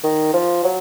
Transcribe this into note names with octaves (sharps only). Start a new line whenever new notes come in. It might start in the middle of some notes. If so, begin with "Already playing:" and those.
D#3
F3
F#3